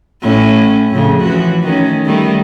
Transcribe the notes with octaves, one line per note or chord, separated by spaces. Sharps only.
A2 C#4
F2 A2 C#3
E3 F3 F#4
D#3 A3 C#4
D#3 G3 A3